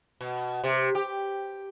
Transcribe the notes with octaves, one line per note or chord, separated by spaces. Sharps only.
B2
C3
G4